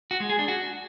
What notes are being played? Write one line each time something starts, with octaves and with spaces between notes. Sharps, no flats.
F#4
G#3
G#4
D4
F#4